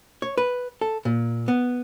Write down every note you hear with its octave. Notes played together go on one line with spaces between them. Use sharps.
C#5
B4
A4
A#2
B3